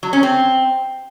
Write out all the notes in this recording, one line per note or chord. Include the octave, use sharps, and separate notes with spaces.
F#3
C#4
C4